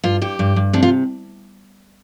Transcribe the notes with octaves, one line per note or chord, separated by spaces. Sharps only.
G2 F4
G2 G4
G2
G2
C3 D4
F4